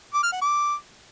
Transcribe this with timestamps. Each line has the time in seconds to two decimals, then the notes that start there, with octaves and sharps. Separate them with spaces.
0.14 D6
0.23 F6
0.32 F#5
0.41 D6